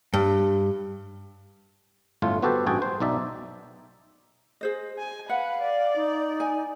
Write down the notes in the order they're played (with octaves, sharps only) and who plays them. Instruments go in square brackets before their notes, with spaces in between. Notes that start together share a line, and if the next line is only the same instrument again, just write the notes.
[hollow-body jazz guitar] G2
[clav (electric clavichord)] G1 A2 A3 F4
B3 F#4 G4 A4 B4 C5
A1 G2 F#4 G#4 G5 A5
C5
B1 D#4 D5 E5
[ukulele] G#4 C5 D#5
[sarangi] G#5
[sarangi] B4 [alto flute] F5 [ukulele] F#5
[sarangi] D5
[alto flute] D#4
[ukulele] G#5